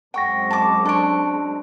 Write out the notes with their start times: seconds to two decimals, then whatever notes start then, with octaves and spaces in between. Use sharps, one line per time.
0.14 F#2 G#3 C4 F#5 G5 C#6 A#6
0.50 A5 D6
0.85 D4 A4 C#5 F#6 D7